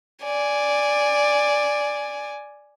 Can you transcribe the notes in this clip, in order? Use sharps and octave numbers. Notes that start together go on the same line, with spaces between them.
D5 G#5